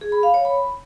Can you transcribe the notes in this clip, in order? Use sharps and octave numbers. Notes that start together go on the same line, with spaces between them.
G#4
B5
F5
C#5
B5